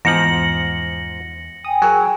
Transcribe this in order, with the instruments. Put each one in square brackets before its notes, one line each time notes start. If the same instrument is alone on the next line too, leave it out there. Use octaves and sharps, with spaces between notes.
[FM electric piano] E2 [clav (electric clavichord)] G#2 F3 [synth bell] A#6 C#7 F#7
[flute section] G5 G#5 [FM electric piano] D#6
[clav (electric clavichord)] F#3 [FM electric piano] G#4 A#4